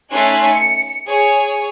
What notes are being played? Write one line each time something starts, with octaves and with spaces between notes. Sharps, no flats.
A3 C#4 D#4 G#5 C6 F#6
C#7
G#4 C#5